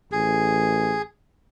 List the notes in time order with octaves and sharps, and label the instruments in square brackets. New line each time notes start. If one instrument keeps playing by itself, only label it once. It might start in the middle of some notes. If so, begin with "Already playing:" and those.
[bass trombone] A1 [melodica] G#4